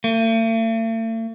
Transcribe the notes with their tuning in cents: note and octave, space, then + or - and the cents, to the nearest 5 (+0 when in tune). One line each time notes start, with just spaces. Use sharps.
A3 +45